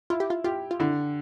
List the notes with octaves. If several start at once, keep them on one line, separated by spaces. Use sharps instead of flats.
E4 F4
G4
F4
F4 G4
F4
D3 E4